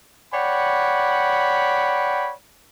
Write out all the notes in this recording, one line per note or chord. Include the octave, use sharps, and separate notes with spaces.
C#5 D5 F#5 G5 B5